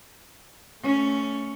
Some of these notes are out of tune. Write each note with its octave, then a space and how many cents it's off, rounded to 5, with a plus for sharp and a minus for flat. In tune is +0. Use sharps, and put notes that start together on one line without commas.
A3 +0 C#4 +10